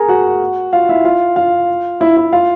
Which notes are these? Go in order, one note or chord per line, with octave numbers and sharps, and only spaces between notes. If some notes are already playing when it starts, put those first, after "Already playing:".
Already playing: G#4 A#4 G#5 A#5
F#4 F#5
F4 F5
E4 E5
F4 F5
F4 F5
E4 E5
E4 E5
F4 F5